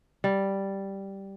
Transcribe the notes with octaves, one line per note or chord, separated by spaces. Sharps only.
G3